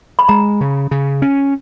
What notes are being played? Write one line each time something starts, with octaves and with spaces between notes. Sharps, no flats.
B5
G#3 A#5
C#3
C#3
C#4